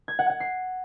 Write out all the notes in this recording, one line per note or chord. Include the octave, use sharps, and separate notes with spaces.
G#6
F#5
F#5
C7